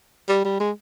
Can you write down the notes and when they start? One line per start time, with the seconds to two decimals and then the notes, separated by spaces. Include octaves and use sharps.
0.29 G3
0.45 G3
0.60 G#3